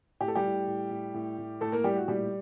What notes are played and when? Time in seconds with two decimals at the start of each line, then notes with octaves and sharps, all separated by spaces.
0.20 A2 G4
0.28 A4
0.35 G3 G4
0.44 A2
0.67 A2
0.91 A2
1.14 A2
1.38 A2
1.61 A2 A3 A4
1.72 A#3 A#4
1.84 A2 G3 G4
1.97 F#4
2.08 A#2 G3 G4